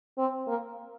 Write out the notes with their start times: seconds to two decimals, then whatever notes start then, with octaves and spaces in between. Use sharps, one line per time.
0.18 C4
0.48 A#3